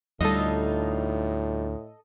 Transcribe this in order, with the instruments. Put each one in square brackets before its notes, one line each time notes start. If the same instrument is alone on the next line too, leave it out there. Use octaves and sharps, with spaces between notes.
[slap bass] D2 [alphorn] A2 [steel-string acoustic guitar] G3 D#4 F4 [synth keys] A4 D#5